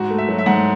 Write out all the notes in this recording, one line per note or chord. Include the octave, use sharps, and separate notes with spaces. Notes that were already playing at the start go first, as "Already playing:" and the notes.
Already playing: G#2 F#4
A3
E5
F#3
E5
G#2 F#5